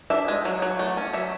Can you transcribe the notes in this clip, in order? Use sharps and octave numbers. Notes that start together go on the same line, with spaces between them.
D4 E5
G#3
F#3
F#3
A3
C#4
F#3 E5